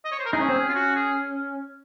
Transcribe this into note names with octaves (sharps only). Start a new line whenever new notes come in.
D#5
C#5
C5
A#4
D#4 G#4
C#4
C4
C#4
F4
F#4
G#4